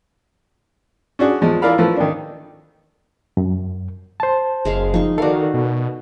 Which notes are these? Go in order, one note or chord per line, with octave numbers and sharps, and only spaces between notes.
C#4 D4 F#4 G#4
E2 F3 G#3
E4 F4 A#4 D5 F5 B5
F3 A3 E4 B4
D#3 D4
F#2
C5 A5
F#1 G#3 E5 F5
F3 D#4 C#6
D#3 F#4 A4 A#4 D5 F5
B2